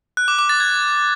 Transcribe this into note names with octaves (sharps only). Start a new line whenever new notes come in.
F#6
D6
D6
A6
G#6